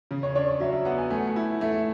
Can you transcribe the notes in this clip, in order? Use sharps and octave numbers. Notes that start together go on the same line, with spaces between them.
C#3
C#5
D4 C#5
C#5
F#3 E5
E5
B3 F#5
G#5
A3 G#5
E4
A3 E5